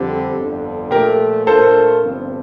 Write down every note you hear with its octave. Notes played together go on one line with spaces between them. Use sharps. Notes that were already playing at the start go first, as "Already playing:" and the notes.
Already playing: F2 D3 G3 C4 G4
G1 F2 D3
A#2 F3 A3 G4 A#4
A#2 A3 D4 F4 A4 A#4 C5
G1 G2 F3 C4